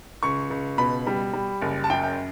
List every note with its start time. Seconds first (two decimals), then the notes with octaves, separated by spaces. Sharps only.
0.23 C#2 C#6
0.51 C#2
0.78 B2 B5
1.07 G3
1.33 G3
1.61 F#1
1.84 A5
1.90 F#2 G5
2.03 G5